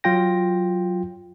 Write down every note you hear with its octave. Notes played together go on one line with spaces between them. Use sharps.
F#3 F4 G5 A#6